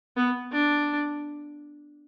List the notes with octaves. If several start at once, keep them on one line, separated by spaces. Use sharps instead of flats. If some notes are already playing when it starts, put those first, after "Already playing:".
B3
D4